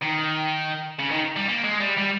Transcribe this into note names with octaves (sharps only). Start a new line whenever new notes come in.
D#3
C#3
D#3
G3
A#3
G#3
G3
G3